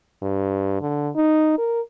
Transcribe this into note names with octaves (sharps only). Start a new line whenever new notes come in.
G2
D3
D#4
A#4